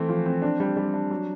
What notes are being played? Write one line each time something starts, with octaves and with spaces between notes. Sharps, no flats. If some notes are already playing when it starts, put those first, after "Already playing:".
Already playing: E3 A3 C4
F3
C4
D4
G3
G3
D4
F#3